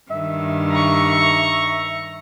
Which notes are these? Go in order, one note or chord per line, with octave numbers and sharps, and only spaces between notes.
G2 D#3 E5
A#5 C#6